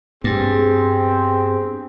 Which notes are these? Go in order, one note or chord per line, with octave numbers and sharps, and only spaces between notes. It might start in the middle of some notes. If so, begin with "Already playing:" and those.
G2 B3 C4 G#4